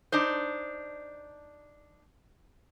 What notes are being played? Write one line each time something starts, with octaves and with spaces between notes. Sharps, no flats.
D4 D#4 C5